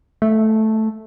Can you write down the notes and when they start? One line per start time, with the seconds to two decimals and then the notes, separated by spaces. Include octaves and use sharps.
0.22 A3